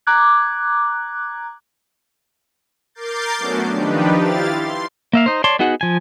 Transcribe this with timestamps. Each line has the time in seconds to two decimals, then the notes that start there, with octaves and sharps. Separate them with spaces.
0.07 A#5 D6 F#6 G#6
2.95 A#4 D6 G6 A6 C7
3.38 F#3 A3 B3 C#4 D4 F#4
3.72 D#3 F3 D4 D#4 G4 B4
4.17 E4 G4 F5 A6
4.53 C6
5.13 A#3 E5 F5
5.26 D#4 C5
5.44 C#5 D5 A5 C6
5.59 B3 D#4 F#4 G#4 F#5
5.81 F3 G#5